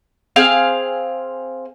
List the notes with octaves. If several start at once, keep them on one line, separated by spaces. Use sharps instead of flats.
C4 G#4 F5